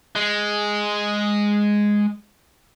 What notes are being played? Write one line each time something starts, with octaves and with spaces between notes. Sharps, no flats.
G#3